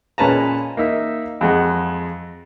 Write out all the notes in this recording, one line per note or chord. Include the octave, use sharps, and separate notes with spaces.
A#2 G#3 C#4 B4 A5 A#5
A#3 D#4 E5
F2 G#3 F#5